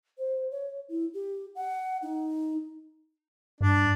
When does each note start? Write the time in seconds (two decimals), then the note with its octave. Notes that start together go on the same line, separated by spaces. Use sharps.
0.18 C5
0.51 C#5
0.89 E4
1.14 G4
1.55 F#5
2.02 D#4
3.61 G2 D4